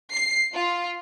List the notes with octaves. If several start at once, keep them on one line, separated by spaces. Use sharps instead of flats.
C7
F4